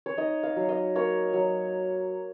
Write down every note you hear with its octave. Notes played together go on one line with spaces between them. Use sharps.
C#5
D#4 D#5
F5
F#3
D#5
A#3 C#5
F#3